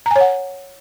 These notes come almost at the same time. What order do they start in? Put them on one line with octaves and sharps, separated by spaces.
A#5 G#5 C#5 F#5